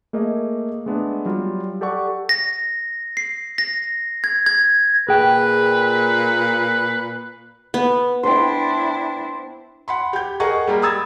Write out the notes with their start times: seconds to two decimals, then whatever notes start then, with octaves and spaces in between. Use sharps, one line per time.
0.13 A3 A#3 G#4 D#5
0.86 G#3 A3 B3 D4
1.26 F#3 G3 F4
1.81 G4 A4 D5 F#5 C#6
2.29 A#6
3.17 C7
3.58 A#6
4.24 G#6
4.46 G#6
5.09 A#2 G#4 B4 G5
7.74 B3
8.23 D4 E4 C5 G5
9.88 F#5 B5 C6
10.13 G4 G6
10.40 G#4 A#4 D#5 F#5 A#5 C#6
10.67 G3 G#3 A#3
10.82 A#5 B5 D#6 E6 G#6 A6